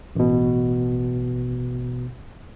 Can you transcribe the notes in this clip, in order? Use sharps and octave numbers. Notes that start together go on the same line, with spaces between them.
A1 B2